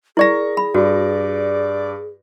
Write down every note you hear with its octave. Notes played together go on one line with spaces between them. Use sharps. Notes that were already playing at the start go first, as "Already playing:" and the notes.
E4 G#4 A#4 D5 A#5 C#6 A#6
B5
G2 F#4 D5